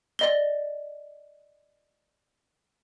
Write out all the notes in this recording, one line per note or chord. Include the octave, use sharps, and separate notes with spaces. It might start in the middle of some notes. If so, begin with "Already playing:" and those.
D5 D#5 G7